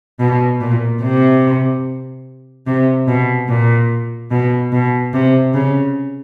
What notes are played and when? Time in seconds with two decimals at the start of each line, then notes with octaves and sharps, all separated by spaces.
0.20 B2
0.61 A#2
1.02 C3
2.67 C3
3.07 B2
3.49 A#2
4.31 B2
4.72 B2
5.13 C3
5.54 C#3